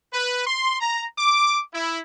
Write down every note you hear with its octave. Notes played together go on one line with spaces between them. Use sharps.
B4
C6
A#5
D6
E4